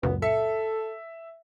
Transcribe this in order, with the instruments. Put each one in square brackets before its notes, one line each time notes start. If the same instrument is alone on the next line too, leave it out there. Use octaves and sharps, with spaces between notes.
[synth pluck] C#2 F#2 A#2 [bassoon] B3
[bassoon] A4 [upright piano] E5 [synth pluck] C#7